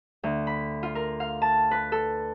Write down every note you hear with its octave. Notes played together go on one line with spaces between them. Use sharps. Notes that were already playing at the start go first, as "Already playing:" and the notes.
D2
B5
F4
A#4
F5
A5
B4
A4